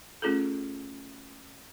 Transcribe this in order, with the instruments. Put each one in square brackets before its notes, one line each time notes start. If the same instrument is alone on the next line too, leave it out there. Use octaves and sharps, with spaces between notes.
[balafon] A3 C#4 F4 G#4 A4